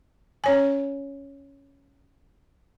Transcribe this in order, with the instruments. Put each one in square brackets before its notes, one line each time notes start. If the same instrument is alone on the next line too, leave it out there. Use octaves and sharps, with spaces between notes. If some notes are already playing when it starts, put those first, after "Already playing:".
[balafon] C#4 C#5 G#5